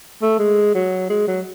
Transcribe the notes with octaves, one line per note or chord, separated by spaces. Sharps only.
A3
G#3
F#3
G#3
F#3